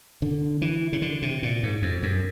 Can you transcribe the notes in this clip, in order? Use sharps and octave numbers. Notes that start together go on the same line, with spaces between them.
D3
E3
C#3
D3
C3
A#2
G#2
F2
F#2